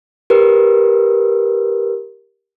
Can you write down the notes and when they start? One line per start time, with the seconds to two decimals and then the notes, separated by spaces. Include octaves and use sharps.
0.30 G4 A#4 B4